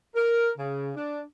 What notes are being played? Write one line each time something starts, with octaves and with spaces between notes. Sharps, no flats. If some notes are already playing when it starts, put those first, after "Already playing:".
A#4
C#3
D4